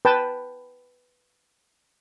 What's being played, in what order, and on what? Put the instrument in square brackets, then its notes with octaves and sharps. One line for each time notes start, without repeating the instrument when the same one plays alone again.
[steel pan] B4 G5 A5